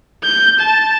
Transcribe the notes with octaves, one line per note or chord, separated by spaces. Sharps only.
G6
A5